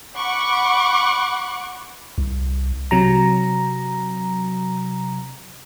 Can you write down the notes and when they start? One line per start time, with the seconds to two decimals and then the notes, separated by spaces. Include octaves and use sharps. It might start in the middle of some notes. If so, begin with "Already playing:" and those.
0.16 F#5 B5 C#6 D6
2.18 C2
2.91 C3 F#3 A#5